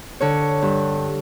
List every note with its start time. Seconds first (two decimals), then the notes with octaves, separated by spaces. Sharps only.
0.20 D3 C#5
0.62 G2